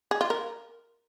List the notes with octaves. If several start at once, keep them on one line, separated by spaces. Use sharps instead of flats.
G#4
F4
A#4